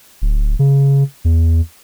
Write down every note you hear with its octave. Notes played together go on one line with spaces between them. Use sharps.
D1
C#3
E2